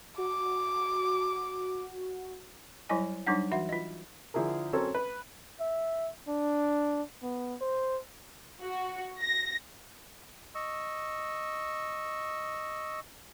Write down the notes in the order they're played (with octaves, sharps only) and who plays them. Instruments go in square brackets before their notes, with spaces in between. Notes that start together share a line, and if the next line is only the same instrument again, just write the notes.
[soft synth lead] F#4 [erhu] D6
[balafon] F#3 G3 E4 D#5 G#5
F#3 G3 D4 D#4 F#5
E3 F#4 E5 F#5
F4 D#5
[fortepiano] D3 F3 E4 G#4 A#4
F#3 C4 C#4 A4 A#4 C#5
B4
[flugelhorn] E5
D4
B3
C5
[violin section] F#4
A#6
[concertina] D#5 C#6 E6